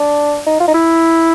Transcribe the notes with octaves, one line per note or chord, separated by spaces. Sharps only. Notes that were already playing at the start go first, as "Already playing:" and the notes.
Already playing: D4
D#4
F4
D#4
E4